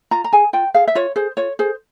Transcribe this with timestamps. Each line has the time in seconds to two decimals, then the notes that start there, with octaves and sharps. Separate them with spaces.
0.11 F4 A#5
0.24 A#5
0.33 G#4 G#5
0.53 F4 G5
0.74 G#4 F5
0.88 E5
0.95 F4 C#5
1.16 G#4 C5
1.37 F4 C#5
1.59 G#4 C5